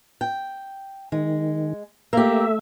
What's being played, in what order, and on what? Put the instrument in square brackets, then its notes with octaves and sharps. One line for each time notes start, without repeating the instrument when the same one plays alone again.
[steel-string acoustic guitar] G5
[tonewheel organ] D#3 [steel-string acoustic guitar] G#3
[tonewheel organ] A3 E5 [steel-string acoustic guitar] A#3 G4